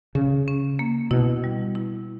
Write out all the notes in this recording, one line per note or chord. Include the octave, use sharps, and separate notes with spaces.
C#3 C#4
C#4
A#3
B2 E4
G3
E4